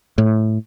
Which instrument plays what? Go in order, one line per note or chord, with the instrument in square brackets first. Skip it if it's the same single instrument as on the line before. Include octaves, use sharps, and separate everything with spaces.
[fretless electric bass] A2